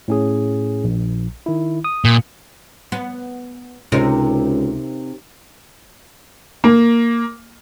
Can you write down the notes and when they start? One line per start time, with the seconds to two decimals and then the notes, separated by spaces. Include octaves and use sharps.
0.08 A2 C#4 G#4
0.84 A#1
1.46 D#3 E4
1.84 D#6
2.05 A#2
2.92 B3
3.92 C#2 C3 D#4 A#4
6.64 A#3